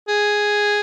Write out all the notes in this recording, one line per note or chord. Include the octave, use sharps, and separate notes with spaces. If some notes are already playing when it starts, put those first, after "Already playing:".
G#4